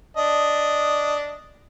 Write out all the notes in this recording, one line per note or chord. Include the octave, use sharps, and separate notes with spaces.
D4 D#5